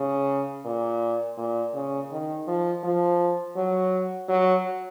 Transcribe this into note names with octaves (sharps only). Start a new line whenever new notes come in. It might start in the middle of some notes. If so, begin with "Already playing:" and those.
Already playing: C#3
A#2
A#2
C#3
D#3
F3
F3
F#3
F#3